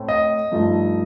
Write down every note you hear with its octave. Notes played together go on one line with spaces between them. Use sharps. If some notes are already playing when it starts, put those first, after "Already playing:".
Already playing: A2 A3 C4
D#5
G2 F3 A3 D#4